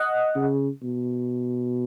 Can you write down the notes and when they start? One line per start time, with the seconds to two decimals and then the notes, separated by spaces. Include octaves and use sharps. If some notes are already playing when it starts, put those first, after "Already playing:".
Already playing: D#5 F#5
0.36 C#3
0.83 B2